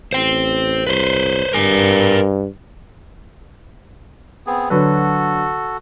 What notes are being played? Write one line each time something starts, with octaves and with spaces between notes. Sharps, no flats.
A1 C5 G5
C2 B4 C5
G2 A#4 G#5
B3 C4 G#4
D3 F#3 F#4 A4 B4